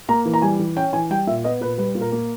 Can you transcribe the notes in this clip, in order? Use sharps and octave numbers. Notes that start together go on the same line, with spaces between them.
A#3 A#5
E3
A#5
G3 G#5
E3
C#4 G5
E3 G#5
G3 G5
A#2 E5
B3 D#5
A#2 B4
G3 B4
A#2
A#4
A#3